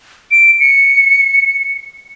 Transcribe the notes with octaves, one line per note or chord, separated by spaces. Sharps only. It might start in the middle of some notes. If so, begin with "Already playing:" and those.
D7
C#7